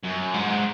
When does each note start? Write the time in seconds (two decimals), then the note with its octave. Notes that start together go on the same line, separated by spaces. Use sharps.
0.04 F#2
0.34 G#2